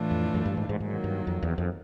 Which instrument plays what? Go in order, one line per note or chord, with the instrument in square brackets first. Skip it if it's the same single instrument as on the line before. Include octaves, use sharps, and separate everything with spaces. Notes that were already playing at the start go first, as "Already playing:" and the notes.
Already playing: [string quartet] A2 E3 A3 D4 F4
[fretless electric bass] F2
F#2
G2
G#2
G#2
[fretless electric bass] G#2 [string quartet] D#3 F#3 A#3
[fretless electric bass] G2
F2
E2
F2